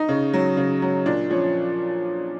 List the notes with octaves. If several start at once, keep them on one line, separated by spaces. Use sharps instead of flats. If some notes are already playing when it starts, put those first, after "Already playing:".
Already playing: D#4
C#3
F#3
C#3
F#3
A#2 D4
F3 C#4